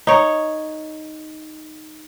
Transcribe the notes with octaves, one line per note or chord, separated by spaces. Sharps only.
D#4 C#5